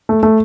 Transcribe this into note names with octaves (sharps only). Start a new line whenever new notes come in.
A3
A3